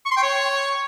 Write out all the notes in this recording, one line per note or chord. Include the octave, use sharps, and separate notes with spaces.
C#6
C6
G5
C#5